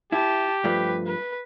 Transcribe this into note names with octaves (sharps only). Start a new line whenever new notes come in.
E4 G4 A5
G2 F3 A3 B4
B4